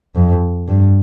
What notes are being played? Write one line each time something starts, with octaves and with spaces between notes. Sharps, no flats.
F2
G2